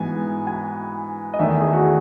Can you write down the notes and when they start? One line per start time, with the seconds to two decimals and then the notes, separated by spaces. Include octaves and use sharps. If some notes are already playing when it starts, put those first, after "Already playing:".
Already playing: G#2 E3 B3 G#5
0.47 G#5
1.34 D#5
1.39 E2 D#3 A3 E5
1.61 G#4
1.73 F#4
1.84 G#4